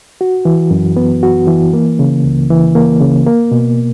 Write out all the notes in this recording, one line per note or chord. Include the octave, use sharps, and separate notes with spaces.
F#4
E3
F#2
B3
F#4
E3
A#3
C#3
C#2
E3
A#3
C#3
A#3
B2